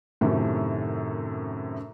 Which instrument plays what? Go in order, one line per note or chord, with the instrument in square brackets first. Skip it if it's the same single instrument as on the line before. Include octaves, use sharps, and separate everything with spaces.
[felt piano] F#2 A2 C3 D#3